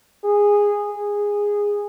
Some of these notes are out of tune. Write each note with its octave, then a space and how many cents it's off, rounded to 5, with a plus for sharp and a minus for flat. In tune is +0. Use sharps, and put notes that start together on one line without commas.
G#4 -10
G#4 -15